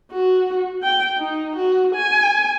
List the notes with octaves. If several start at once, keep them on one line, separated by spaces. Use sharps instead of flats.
F#4
G5
D#4
F#4
G#5